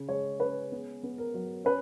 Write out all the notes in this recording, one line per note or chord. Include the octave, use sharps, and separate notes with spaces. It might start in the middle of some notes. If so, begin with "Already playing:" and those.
Already playing: C#3
G#3 C#5
C#4 B4
B3 G#4
B3
A#4
F#3
C#4 B4